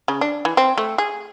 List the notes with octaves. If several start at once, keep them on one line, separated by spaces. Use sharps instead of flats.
C#3
D4
E3
C4
A3
G#4